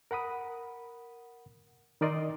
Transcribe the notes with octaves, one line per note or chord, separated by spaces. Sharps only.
A#4 F#5 B5 D#6
D#3 D#4 A#4 D5 D#5 C6